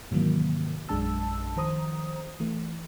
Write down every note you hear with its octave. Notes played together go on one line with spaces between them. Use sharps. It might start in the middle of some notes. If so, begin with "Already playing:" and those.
G#2 C3 D#3 E3 F#3 A#3
A#1 F#2 G#3 D4 A5 E6
D#3 F3 C5 A#5 D#6
E3 A3